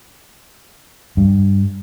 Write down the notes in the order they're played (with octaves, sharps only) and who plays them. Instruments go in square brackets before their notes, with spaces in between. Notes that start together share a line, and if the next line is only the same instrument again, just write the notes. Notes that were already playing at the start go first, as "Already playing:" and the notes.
[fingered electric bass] G2